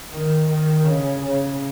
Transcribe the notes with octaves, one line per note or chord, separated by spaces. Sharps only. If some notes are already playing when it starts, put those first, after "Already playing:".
D#3
D#3
C#3
C#3